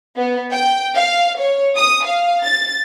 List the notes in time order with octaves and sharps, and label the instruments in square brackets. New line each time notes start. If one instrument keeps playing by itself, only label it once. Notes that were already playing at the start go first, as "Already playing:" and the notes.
[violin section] B3
G5
F5
C#5
D#6
F5
A6